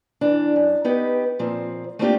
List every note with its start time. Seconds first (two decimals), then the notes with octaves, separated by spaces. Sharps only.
0.21 E3 D4
0.56 F#2
0.85 B3 D#4 G4 B4
1.39 A#2 F3 C4
1.99 A3 A#3 C4 D4 F4 G4